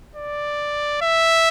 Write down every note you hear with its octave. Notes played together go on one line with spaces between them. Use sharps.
D5
E5